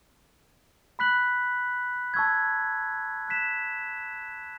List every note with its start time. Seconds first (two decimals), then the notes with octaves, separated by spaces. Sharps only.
0.99 B5 F#6 B6 F#7
2.14 A5 C#6 E6 G#6
3.28 F#6 B6 E7